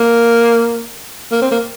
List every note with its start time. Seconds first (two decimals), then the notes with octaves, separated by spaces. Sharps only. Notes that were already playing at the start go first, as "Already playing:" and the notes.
Already playing: A#3
1.32 A#3
1.42 C4
1.52 A#3